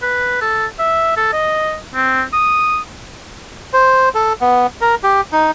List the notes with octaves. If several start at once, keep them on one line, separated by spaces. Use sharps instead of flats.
B4
A4
E5
A4
D#5
C4
D#6
C5
A4
B3
A#4
G4
D#4